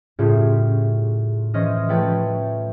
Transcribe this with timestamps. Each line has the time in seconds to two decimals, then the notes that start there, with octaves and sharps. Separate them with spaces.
0.19 A2 C#3 G3 C#4 F4 G4
1.54 E3 C#4 C5 D#5 F6
1.88 F3 A3 B4 C#5 G5 A6